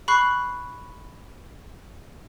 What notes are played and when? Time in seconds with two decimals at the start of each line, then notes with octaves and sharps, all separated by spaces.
0.08 B5 C#6 F#6 C7